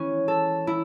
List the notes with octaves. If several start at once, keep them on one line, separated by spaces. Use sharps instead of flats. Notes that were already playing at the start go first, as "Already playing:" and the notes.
Already playing: E3 C#4
A4
E4